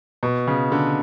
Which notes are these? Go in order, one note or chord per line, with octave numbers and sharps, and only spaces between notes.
B2
C#3
D3